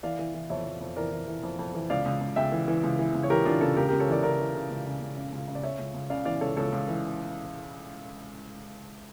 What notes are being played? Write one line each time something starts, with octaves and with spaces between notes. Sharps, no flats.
E3 D5 F5
E3
E3
F2 C#5 E5
F2
F2
E3 A#4 D5
E3
E3
F2
F2
E3
C#2 D5 F5
C#2
C#2
C#2 E5 G5
E3
E3
C#2
E3
C#2
C#5
E3 G4 A#4
E3 D4 F4
C#3 F4 A4
C#2 G4 A#4
C#2 G4 A#4
A4 C#5
E3 A#4 D5
C#3 A#4 D5
E3
C#3
C#2
C#3
C#2
C#3
C#2
C#3
D5
C#3 C#5 E5
C#2
C#2
C#3 D5 F5
E3 D5 F5
C#2 A4 C#5
C#2 A4 C#5
C#2
E3